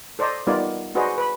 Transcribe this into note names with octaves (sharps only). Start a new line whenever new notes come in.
A4 C5 D5 D#5 A#5
G3 B3 D#4 F4 A#4 D5
D4 F#4 G#4 B4 C5 D#5
B4 B5